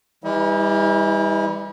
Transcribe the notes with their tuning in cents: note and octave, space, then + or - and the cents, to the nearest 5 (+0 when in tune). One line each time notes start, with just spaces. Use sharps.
E3 +0 G3 +30 E4 -45